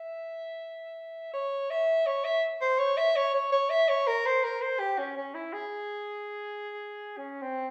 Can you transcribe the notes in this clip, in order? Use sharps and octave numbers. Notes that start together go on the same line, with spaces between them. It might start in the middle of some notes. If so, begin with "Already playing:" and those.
Already playing: E5
C#5
E5
C#5
E5
C5
C#5
E5
C#5
C#5
C#5
E5
C#5
A#4
C5
A#4
C5
G4
C#4
C#4
E4
G#4
C#4
C4